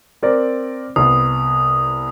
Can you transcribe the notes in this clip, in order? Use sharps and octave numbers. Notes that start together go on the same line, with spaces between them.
C4 A#4 D5
C2 B3 D#6